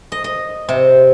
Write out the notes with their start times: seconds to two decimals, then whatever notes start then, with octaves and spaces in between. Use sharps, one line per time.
0.12 D#5
0.24 D#5
0.69 C3